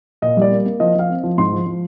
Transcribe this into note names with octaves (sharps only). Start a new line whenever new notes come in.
A#2 D#5
G3 D5
A#3
A#3
F3 D#5
F3 F5
C4
F3
G#2 C6
F3
F3